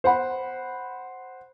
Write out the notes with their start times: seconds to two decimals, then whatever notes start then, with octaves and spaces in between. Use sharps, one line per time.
0.04 C5 F#5 B5